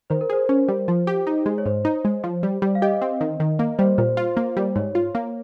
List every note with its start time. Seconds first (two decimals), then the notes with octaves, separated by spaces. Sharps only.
0.10 D#3 C5
0.21 A#4
0.30 G#4 C5
0.49 C#4
0.68 G3
0.88 F3
1.07 G4
1.27 D#4
1.46 G#3
1.58 C#5
1.66 G#2 C5
1.85 D#4
2.05 G#3
2.24 F3
2.43 G3
2.62 G3
2.75 F5
2.82 G4 D#5
3.02 C4
3.21 D#3
3.40 D#3
3.59 A#3 D#5
3.78 G3 C5
3.98 A#2 C5
4.17 F4
4.37 A#3
4.57 G3
4.76 G#2 C#5
4.95 F4
5.15 A#3